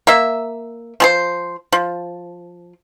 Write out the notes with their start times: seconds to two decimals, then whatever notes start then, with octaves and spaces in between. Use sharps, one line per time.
0.07 A#3 E5
1.00 F3 G#4 C5
1.72 F3